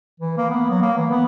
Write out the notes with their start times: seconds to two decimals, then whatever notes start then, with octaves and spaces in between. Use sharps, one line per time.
0.20 E3
0.37 A#3
0.50 B3
0.70 F#3
0.82 A#3
0.97 E3
1.10 B3